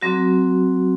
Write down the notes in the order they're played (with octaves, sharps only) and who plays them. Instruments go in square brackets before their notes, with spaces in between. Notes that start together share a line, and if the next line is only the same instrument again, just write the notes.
[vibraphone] F#3 C4 F#4